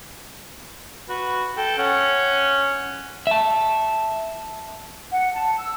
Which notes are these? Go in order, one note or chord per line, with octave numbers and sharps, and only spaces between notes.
F#4 B4
A4 G5
C#4 F#5
E5 A5
F#5
A5
E6